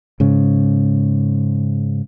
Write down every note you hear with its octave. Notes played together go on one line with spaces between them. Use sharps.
G#2 C#3